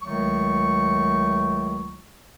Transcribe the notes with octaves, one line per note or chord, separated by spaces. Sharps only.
C#2 D#3 F#3 A3 C#6